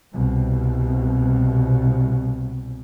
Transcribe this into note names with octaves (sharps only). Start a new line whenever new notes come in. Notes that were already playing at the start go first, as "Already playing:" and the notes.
C2 B2